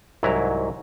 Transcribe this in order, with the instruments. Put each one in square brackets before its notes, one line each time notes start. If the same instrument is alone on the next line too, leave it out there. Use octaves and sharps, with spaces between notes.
[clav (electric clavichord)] C2 G#2 F#3 E4 A#5